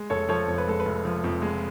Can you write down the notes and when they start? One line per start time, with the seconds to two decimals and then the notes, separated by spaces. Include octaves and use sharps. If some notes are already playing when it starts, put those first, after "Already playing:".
Already playing: G#3
0.10 F1 A4 C#5
0.29 F3 A4 C#5
0.48 F2 C#5
0.58 B4
0.67 G#3 A4
0.80 B4
0.85 F1
1.05 F3
1.24 F2
1.42 G#3